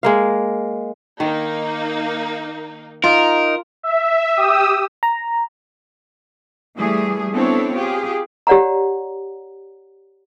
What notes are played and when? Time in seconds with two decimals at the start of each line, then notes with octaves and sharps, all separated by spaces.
0.03 G#3 A#3 F5
1.20 D#3 A#3 D#4
3.04 D#4 F4 A#4
3.83 E5
4.35 G4 D#6 E6
5.03 A#5
6.76 E3 G3 A3 G#4
7.32 B3 C4 D4 E4 A4 C#5
7.73 F4 G4 G#4
8.47 G4 C#5 D5 F#5 A#5